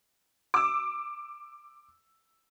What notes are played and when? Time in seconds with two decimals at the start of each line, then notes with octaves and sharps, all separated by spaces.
0.54 D6 E6